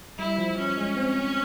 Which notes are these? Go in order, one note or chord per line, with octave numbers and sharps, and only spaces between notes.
G3 E4
F3
C#4
G#3
C4